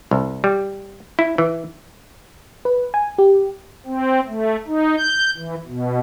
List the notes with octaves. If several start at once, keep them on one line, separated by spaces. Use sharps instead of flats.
C2
G3
E4
E3
B4
G#5
G4
C4
A3
D#4
G6
E3
B2